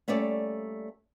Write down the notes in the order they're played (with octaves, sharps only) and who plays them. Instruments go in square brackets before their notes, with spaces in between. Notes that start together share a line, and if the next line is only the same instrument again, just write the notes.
[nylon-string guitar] G3 A3 A#3 C#4 C#5 D5